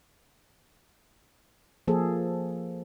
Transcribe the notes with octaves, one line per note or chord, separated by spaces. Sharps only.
F3 A#3 G#4 A4